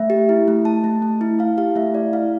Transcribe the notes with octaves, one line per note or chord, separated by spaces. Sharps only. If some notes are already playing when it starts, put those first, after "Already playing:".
Already playing: A3 E5
G4
E4
A3
A3 A5
A3
A3
E4
E4 F5
G4 F5
A3 E5
E4 D5
E4 F5